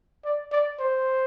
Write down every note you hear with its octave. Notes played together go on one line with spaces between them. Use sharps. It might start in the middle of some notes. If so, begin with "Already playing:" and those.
D5
D5
C5